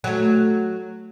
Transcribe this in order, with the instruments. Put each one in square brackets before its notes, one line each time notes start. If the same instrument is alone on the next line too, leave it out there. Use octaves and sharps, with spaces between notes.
[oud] F#3 A3